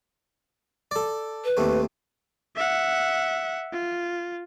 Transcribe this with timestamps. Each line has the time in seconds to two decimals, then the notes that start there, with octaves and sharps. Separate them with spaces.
0.91 A4 D5
1.45 B4
1.57 D#2 A3 C4
2.56 E5 F#5
3.72 F4